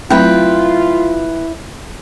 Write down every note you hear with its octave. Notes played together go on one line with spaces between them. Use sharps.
F#3 A3 C4 E4 F4 B4 G5